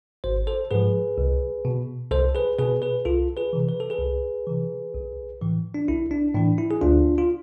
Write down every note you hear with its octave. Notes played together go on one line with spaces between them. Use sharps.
G#1 C5
A4 C5
G#2 F3 G#4 B4
C2
B2
C2 A4 C5
G#4 B4
B2 G#4 B4
G#4 B4
C2 F4 A4
G#4 B4
C3 E3
B4
A4
G#4 B4
C2
C3 E3
B1
A2 E3
D4
B1 E4
D4
A2 E3 D4
E4
G#4
D2 D4 F4
F4